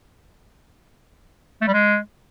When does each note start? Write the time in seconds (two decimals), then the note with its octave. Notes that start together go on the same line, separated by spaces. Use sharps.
1.61 A3
1.67 G3
1.73 G#3